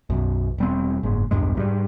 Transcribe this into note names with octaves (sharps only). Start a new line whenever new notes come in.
B1 F#2
E1 G3 C4
F#1 G#2
B1 E2 G2 G#3
G#2 E3 G3